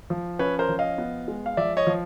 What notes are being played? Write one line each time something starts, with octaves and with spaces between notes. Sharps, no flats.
F3
C#4 B4 C#5
A#4 C5
F3
D#5 F5
B3
G#3
F5
F3 D5 E5
C#5 D#5
F3